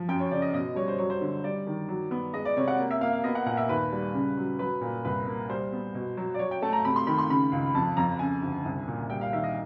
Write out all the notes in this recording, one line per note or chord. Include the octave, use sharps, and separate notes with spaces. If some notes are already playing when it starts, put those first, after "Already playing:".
Already playing: F3
F#2 G5
C#5
C#3 D5
D#5
B2 D#5
G3 C#5
C5
F#3 C#5
C5
D3
G3 D5
D#3
F#3
B3
G#3 D#5
D5
C3 C#5
F#5
A#3
E5
A#3 F5
F5
B3 D#5
F#5
A#2 F#5
E5
D#2 B4
G3
C#3
F#3
F#3 B4
A#2
C2 B4
A#3
G3 C5
B3
B2
F#3
D5
F#3 C#5
G5
A3 A5
A#5
C3 B5
C6
D#3 B5
C6
C#3 B5
C#2
F2 A5
F2 A#5
C#3 G#5
D2
C2
A#2
G3 G5
F5
D#3 E5
D#5